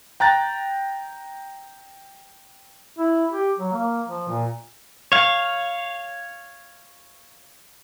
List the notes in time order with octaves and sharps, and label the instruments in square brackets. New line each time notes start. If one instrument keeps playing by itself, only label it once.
[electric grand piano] G5 A#5 F#6 A6
[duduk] E4
G4
F#3
A#3
F3
A#2
[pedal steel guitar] C#5 F5